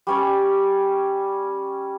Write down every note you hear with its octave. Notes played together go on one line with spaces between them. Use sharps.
G3 C#4 D5